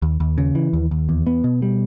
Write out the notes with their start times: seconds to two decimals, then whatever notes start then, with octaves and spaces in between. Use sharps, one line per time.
0.02 D#2
0.20 D#2
0.38 C#3
0.55 E3
0.73 D#2
0.91 D#2
1.09 E2
1.27 B3
1.44 B2
1.62 G3